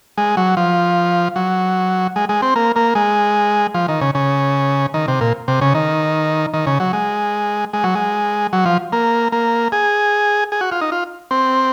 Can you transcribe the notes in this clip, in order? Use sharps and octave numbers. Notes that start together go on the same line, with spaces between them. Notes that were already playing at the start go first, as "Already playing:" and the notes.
G#3
F#3
F3
F#3
G#3
G#3
C4
A#3
A#3
G#3
F3
D#3
C#3
C#3
D#3
C3
A#2
C3
C#3
D#3
D#3
C#3
F#3
G#3
G#3
F#3
G#3
F#3
F3
A#3
A#3
G#4
G#4
F#4
F4
D#4
F4
C4